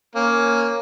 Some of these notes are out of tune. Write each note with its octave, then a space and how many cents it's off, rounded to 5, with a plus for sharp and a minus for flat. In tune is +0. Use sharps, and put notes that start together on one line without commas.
A#3 +0 C#4 +0